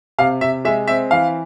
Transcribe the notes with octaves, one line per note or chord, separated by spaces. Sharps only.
C3 F5
C3 E5
G#3 E5
C4 E5
E3 F5